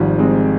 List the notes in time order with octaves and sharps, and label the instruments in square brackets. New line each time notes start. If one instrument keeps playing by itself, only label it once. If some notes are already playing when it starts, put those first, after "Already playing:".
Already playing: [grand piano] G#1 G#2 G3 [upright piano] D#3 F3
[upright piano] G#3 C4